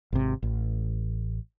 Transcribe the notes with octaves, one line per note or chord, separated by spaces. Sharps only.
G#1 C3
A1